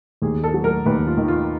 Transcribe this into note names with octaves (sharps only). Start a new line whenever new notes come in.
D#2 G#4
A4
F#3
A#4
D#2 B4
F4
D#3
F4